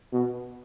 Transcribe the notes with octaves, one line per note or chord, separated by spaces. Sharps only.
B2